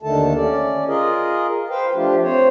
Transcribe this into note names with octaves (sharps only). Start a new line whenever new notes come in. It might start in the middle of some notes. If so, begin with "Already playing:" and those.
D#2 D3 D#3 A3 A4 A5
C#4 D5
F4 G#4 A#4 D#5
B4 C5 F5 G5
F3 A3 D4 F4 G4
C4 C5 C#5